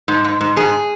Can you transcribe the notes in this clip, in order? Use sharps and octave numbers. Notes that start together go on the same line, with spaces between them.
G#2
G#2
G#2
G#2 G#4